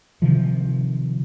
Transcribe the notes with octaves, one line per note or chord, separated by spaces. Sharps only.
C3 D#3 F3